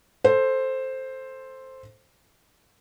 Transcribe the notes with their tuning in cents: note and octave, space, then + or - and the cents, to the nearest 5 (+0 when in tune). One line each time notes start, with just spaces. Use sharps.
A4 +0 C5 +5